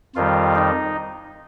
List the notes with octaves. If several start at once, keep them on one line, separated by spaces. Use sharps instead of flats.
F2 D#3 G3 F4
D#4